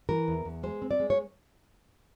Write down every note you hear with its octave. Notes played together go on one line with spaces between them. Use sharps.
E3 A#4
E2
E2
G#3 C5
C4
D5
G#3
C#5